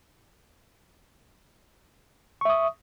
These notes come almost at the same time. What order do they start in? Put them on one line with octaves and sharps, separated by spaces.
C#6 E5 D#6